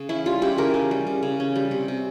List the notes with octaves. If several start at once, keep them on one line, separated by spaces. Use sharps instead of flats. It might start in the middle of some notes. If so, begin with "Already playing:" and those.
Already playing: C#3
C#4 E4
G3 F4
C#3 E4 G4
C#3 G4 A#4
C#4
G3
C#3
C#3
C#4
G3
C3
C3